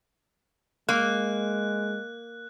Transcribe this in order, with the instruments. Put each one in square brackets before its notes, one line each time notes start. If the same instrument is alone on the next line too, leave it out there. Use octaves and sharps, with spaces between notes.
[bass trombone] G#3 [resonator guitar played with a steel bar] A#3 [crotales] F#6